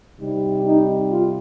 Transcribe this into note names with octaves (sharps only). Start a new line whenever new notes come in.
C3 G3 C4 D#4
D#4
F4